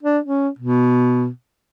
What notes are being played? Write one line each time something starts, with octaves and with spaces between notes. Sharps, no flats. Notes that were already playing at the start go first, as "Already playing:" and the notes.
D4
C#4
B2